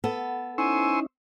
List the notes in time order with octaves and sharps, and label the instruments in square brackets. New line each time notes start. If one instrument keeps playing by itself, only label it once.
[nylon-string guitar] B3 A4
[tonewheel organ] C#4 D#4 E4 [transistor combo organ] C5 C#6 E6 [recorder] G#5